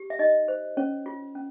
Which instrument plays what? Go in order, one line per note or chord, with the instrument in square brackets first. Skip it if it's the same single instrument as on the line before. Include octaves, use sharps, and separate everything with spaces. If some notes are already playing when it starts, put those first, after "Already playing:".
Already playing: [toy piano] G4
E5
D#4 D#5
C5
C#4 C#5
F4
C#4